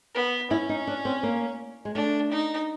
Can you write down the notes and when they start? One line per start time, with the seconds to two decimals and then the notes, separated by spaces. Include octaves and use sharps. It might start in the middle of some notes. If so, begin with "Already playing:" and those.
0.15 B3
0.51 C#4 E4
0.69 D#4
0.87 D4
1.05 C4
1.23 A#3
1.85 G#3
1.95 A3 D4
2.32 D#4